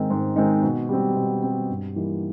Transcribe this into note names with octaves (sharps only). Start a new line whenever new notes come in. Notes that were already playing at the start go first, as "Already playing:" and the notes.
Already playing: G#2 D#3 G#3 C4 D#4
G#2
D#3 G#3 C4 D#4
B2
G3 C4
B2
G3 C4
G2
E3 G3 A#3 D#4